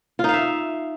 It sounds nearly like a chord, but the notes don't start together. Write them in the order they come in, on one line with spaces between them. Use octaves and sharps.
F4 D#4 F5 E5